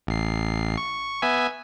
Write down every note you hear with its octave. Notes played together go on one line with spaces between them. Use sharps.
A1 C7
C#6
B3 E5 G#5